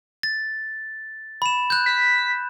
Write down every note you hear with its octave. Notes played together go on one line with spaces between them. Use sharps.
A6
B5 E7
F#6 G6
B6